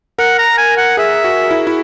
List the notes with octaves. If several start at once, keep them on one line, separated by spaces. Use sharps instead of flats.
A#4 F#5
A#5
G#5
F#5
G#4 E5
F#4
E4
E4